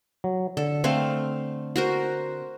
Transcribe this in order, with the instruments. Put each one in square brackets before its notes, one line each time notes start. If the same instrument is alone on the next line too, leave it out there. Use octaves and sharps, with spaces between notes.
[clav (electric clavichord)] F#3
[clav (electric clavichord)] D3 [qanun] A4
[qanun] A3 C4 F5
F#4 A#4 C5